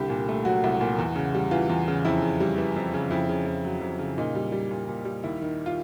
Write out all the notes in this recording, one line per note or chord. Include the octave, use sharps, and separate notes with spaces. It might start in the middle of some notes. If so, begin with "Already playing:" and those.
Already playing: C2 D3 G4
A#2
A3
F#3 F#4
C2
A#2
E2
C#3
G3
E3 F4
E2
C#3
F2 E4
C#3
G3
E3
F2
C#3
F2 E4
C#3
F2
F#3
F2
C#3
A#2 D#4
G3
G3
A#2
A#2
G3
D#2 E4
D#3
F4